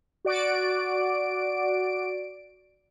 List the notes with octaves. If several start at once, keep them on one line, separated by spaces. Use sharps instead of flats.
F#4 D5 D7